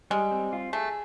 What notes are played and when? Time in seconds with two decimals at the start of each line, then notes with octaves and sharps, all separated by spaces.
0.11 G3 G#3
0.31 C4
0.53 F4
0.73 A3 G#4